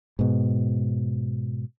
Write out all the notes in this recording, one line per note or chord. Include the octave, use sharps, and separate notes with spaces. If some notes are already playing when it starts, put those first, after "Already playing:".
G#2 B2